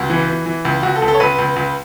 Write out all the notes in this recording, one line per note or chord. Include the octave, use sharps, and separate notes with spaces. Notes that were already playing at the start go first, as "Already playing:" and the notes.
Already playing: C#2 F#4
E3
E3
E3
C#2
C#2 F#4
A4
C#2
A4
C#5
C#2 B4
C#2
C#2